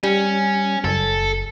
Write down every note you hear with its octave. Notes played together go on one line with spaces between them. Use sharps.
G3 C#4
F#1 A4